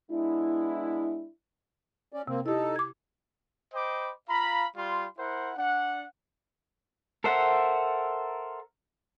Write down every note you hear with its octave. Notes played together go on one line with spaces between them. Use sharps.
G#3 B3 D4 E4
C#4 D5
C3 A#3 C4
D#4 E4 G4 A4
D6 G#6
C5 D#5 G5 B5 D6
F4 F5 A#5 B5
G3 F4 C6
E4 A#4 C5 F#5
D4 F#5
A4 A#4 C5 E5 F#5